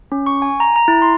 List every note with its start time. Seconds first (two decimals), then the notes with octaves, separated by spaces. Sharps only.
0.12 C#4
0.26 C#6
0.42 G#5
0.60 A#5
0.76 A#5
0.88 E4
1.02 C6